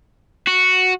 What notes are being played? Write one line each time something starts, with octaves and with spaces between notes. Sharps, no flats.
F#4